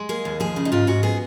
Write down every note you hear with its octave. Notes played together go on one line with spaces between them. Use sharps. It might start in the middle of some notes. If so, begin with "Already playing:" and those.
Already playing: G#3
A#3 G#4
D#2
F3 G#4
C#3
D#4
G#2 F4
G#2 F#4
B3 G#4